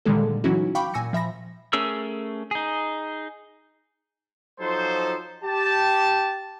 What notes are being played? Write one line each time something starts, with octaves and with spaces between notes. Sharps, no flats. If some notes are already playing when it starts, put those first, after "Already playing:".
A#2 D3 D#3 G3 G#3 A4
E3 F#3 C#4 D#4 E4 F#4
F5 G5 B5 C#6 D6 G6
A#2 G#5 E6 A#6 C#7
F3 E5 B5 A#6
A3 C#4 G#4 A#4 E6
D#4 G#4
F3 F#3 D#4 A4 C5
G4 A5